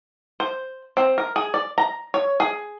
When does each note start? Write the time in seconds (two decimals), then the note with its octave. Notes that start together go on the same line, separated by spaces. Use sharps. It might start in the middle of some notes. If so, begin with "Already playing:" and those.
0.40 C5
0.97 C4
1.18 A#4
1.36 G#4
1.54 D5
1.78 A#5
2.14 C#5
2.40 G#4